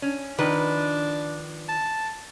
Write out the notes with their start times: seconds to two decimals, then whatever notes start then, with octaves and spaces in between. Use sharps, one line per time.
0.02 C#4
0.38 D#3 F3 D4 B4
1.69 A5